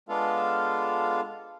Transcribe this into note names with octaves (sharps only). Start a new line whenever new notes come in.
G#3 B3 D4 F4 A4 F5